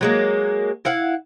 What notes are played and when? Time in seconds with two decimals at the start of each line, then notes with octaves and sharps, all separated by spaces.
0.01 F#3 G#3 A#3
0.85 E4 F5 F#5